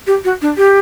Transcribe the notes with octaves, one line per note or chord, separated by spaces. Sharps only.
G4
F#4
D4
G4